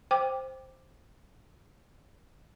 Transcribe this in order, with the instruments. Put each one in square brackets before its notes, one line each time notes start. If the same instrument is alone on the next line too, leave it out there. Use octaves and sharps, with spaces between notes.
[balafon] C5 G5 D6